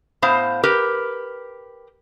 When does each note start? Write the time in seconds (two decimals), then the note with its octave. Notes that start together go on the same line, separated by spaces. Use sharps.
0.22 A2 B3 C5 F5
0.63 G4 A#4 B4